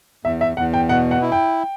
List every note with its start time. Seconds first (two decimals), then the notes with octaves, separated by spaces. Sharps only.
0.25 E2 E5
0.41 E5
0.57 E2 F#5
0.74 G5
0.89 B2 F#5
1.11 F#5
1.22 E4
1.32 G5